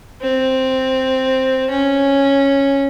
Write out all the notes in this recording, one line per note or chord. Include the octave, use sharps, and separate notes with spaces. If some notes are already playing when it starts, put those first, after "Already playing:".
C4
C#4